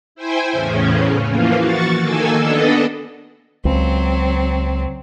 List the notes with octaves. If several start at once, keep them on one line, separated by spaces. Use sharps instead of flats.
E4 C5 G5 G#5
E2 A2 C#3 C#4
E3 F3 A#3 F4
F#4 C#6 A6
D#3 A#3 A4 G#5 E6
B3 D4 A4 D#5
C#2 F#3 C4